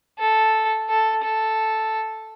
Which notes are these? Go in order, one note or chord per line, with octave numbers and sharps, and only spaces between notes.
A4
A4
A4